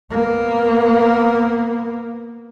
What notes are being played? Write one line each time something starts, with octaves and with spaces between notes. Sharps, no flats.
A#3 B3